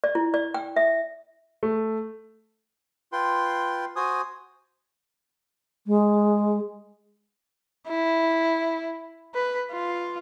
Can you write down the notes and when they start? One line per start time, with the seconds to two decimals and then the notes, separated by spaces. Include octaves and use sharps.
0.04 D5
0.15 E4
0.34 D5
0.54 G5
0.76 E5
1.63 A3
3.12 F4 B4 G5 C6
3.96 F#4 C5 G#5 D#6
5.87 G#3
7.88 E4
9.34 B4
9.72 F4